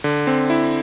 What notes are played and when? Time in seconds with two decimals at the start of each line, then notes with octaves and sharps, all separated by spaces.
0.04 D3
0.27 C4
0.50 E4